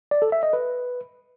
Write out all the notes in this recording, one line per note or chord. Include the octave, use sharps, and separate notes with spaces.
D5
A4
E5
D#5
B4